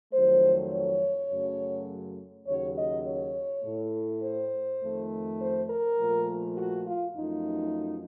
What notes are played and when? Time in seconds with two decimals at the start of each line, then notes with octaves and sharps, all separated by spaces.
0.13 F2 D#3 F#3 A3 C5
0.72 C#5
1.30 F#2 C#3 F#3 A3
2.47 D#2 C#3 F#3 C#5
2.77 D#5
3.06 C#5
3.64 A2 A3
4.23 C5
4.82 F2 D#3 A3
5.40 C5
5.69 A#4
5.98 A#2 F3 A3
6.57 F#4
6.86 F4
7.15 F#2 F3 A3 D#4